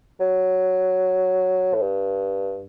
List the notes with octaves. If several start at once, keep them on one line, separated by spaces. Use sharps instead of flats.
F#3
A2
G2